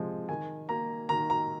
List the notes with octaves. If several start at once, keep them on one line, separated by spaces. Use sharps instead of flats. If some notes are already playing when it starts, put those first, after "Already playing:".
Already playing: C3 F3 G#3
D#3 G#5
A#3 A#5
D#3 A#5
A#5